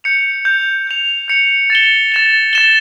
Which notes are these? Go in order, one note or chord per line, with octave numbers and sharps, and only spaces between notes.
G6 C#7 F7
G6 C#7 F7
G6 C#7 F7
G6 C#7 F7
A6 E7 G7
A6 E7 G7
A6 E7 G7